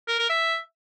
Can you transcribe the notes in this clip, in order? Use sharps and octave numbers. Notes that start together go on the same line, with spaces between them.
A#4
A#4
E5